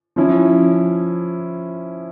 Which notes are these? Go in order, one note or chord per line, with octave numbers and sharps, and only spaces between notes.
F3 C#4 E4